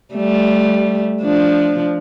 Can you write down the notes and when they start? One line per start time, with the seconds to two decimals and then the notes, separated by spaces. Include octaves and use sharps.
0.14 G3 A3
1.22 F3 D4